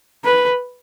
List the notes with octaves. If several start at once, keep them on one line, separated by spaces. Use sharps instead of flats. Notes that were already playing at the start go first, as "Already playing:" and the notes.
B4